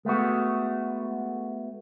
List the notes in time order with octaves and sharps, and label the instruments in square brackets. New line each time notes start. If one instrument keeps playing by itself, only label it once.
[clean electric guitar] G#3 A3 B3 F#4